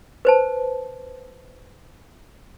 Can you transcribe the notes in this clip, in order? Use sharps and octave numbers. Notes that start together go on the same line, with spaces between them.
B4 C5 A5